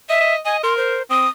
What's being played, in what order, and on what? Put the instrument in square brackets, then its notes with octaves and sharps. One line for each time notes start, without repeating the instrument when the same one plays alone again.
[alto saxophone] D#5 [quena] E5
[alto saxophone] D#5
[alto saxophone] D#5 [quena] G#5
[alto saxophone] A#4 [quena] C6
[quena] C5
[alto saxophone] C4 [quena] D#6